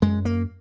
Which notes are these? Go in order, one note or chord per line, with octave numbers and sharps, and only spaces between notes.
F#2 G#3
A#3